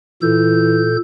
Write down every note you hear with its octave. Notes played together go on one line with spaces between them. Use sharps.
A#2 E3 A4 G6